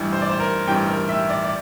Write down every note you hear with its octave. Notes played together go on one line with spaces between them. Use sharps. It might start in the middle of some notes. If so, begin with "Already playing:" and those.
Already playing: A1 G2 E3 G3
C5
D5
C5
A#4
A1 G2 E3 G3 G5
A#4
E5
D5
D5